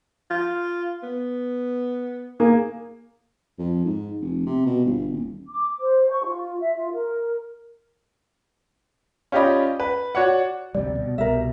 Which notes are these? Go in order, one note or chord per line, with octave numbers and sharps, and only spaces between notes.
F4
B3
A#3 G#4
F2
G#2
F1
C3
B2
G1
D#1
D6
C5
C#6
F4
E5
F4
A#4
C#4 F4 G4 D5 D#5 B5
B4
F#4 C#5 D5 F#5
D2 C3 G3 D5
B2
C2 B2 G3 A#4 E5